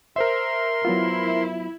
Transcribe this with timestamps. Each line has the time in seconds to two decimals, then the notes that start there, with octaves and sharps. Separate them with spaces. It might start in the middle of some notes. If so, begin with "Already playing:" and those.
0.16 A#4 C5 E5 C6
0.85 F#3 B3 E4 F4